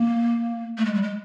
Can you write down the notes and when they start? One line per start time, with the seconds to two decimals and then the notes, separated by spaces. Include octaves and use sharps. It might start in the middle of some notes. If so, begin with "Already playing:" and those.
Already playing: A#3
0.78 A3
0.85 G#3
0.94 G3
1.02 G#3